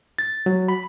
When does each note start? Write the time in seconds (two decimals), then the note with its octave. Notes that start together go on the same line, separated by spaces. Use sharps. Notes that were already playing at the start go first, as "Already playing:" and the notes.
0.18 A6
0.46 F#3
0.68 B5